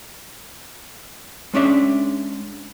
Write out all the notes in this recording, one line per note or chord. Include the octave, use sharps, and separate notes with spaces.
G#3 C#4 D4 E5